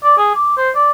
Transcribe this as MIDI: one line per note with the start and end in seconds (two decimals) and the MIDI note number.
0.04 0.15 74
0.18 0.31 68
0.35 0.53 86
0.57 0.70 72
0.75 0.91 74